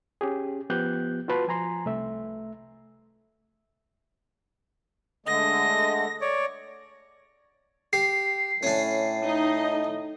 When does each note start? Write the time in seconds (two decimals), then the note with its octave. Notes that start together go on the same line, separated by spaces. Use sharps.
0.21 C#4 G4 G#4
0.70 F3 B3 G4 F#6 G6
1.28 F4 F#4 B4 A5 C6
1.48 F3 G#5 A#5 C6
1.86 C2 A3 E5
5.26 D3 G#3 A3 D#5 A#6
6.21 C#5 D5
7.93 G4 C7
8.63 A2 C#4 D4
9.23 D#4 D#5